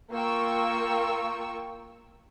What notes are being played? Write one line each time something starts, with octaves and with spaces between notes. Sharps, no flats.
A#3 F4 A#4 G5 C#6 E6